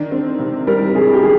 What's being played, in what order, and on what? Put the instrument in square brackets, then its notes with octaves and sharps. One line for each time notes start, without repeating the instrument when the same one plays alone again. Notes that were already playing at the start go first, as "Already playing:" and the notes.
Already playing: [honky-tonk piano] D#3 [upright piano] D4
[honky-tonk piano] C4
C3
[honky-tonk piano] G3 [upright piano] A#4
[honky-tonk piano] C3 [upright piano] G#4
[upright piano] G4
[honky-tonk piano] D#3 [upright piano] G#4